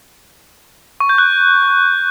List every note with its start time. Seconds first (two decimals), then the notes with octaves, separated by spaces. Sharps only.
1.00 C#6
1.09 G6
1.18 F#6